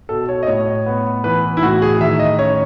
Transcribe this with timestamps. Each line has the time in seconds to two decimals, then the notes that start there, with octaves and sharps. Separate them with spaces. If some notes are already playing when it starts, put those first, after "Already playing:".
0.09 B2 A4
0.29 C#5
0.43 D#5
0.47 A2 C#5
0.86 B3
1.24 E3 B4
1.57 E4
1.63 A2 F#4
1.82 G#4
2.01 D#3 E5
2.19 D#5
2.38 C#4 C#5